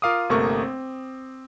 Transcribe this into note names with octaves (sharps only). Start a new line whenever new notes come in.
F4 A#4 F5 D6 D#6
G1 C3 A3 A#3 A#4 C#6
C4